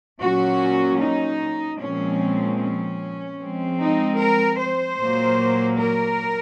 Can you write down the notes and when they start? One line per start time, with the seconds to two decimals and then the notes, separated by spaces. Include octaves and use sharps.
0.20 A#2 F#3 C#4 F#4
1.00 D#4
1.79 A#2 F3 G#3 C4 C#4
2.59 C#4
3.39 F3 G#3 C4
3.79 D#4
4.19 A#4
4.59 C5
4.98 A#2 F#3 A#3
5.78 A#4